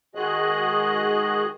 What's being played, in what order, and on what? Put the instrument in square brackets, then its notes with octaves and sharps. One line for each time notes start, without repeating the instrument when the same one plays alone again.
[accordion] D#3 G#3 F#4 G#4 D#5 F#6